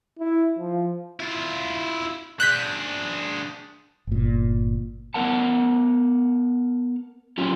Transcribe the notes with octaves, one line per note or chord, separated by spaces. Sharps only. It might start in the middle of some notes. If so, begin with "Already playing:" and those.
E4
F3
E4 F4
D4 G#4 F#6 G6 B6
G1 A#2
B3 A#4 F#5 A5
F#3 C#4 F4 G4